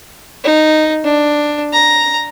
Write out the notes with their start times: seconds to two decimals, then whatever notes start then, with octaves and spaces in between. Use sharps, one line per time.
0.44 D#4
1.04 D4
1.73 A#5